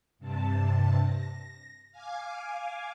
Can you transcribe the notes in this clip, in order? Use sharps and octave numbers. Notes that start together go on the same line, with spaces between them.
G2 C3 A5
A#6
F5 G#5 D6